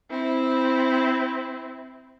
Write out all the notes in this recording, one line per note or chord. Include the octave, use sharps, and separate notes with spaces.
C4 E4